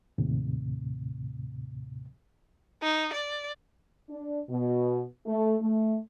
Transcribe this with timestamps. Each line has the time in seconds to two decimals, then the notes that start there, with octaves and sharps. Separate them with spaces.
0.18 D#2 A2 C3
2.83 D#4
3.13 D5
4.09 D4
4.49 B2
5.26 A3
5.60 A3